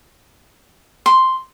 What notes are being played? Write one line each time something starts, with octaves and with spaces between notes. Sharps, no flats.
C6